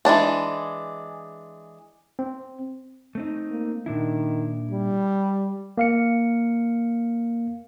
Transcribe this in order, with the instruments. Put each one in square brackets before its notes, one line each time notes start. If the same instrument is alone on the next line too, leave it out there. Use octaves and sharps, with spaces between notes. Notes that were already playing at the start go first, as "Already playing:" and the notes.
[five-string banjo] E3 G#3 D4 A5
[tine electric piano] C4
[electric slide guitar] A3 C4 D#4
[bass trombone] A#3
[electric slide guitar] A#2 D4 E4 [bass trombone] D#3
[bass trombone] G3
[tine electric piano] A#3 F5 C#7